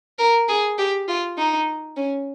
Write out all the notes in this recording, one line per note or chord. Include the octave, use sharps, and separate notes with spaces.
A#4
G#4
G4
F4
D#4
C#4